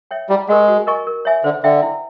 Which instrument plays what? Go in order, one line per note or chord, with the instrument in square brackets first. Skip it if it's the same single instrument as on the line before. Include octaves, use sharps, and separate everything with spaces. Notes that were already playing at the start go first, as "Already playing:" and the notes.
[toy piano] C#5 E5 G5
[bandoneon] G3 [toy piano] E4
[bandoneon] G#3 [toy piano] G4 A#4 D#5 F#5
[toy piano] F#4
A#4 D#5 G#5 C#6
A#4
C#5 E5 G#5
[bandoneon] D3 [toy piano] C5
[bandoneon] D3 [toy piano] E5 G5
[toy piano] E4